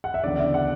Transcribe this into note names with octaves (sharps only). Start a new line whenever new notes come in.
F#5
E5
D2 C#3 E3 B3 D4 D5
E5
F#5